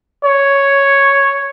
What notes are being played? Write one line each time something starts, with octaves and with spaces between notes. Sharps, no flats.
C#5